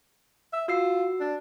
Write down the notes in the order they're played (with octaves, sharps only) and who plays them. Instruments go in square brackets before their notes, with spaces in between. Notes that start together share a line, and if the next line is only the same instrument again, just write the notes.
[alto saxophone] E5
[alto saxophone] F4 [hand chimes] F#4 E6 C7
[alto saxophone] D4